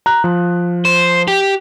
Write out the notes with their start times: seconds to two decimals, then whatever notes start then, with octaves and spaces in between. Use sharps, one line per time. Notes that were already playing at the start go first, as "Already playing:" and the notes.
0.06 A#5 F#6
0.24 F3
0.85 C5
1.28 G4